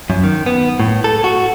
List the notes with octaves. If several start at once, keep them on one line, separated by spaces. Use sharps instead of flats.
F#2
D#3
B3
A2
A4
F#4